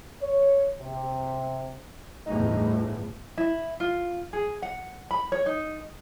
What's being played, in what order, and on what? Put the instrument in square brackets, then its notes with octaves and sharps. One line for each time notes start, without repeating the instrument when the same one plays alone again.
[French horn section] C#5
C3
[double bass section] G1 E2 A2 [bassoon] D#4
[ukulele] E4
F4
G#4
F#5
B5
C#5
D#4